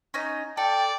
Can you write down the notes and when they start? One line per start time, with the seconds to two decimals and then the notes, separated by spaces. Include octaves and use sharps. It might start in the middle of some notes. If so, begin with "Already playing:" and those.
0.14 C#4 D#4 D#5
0.57 A4 D5 G5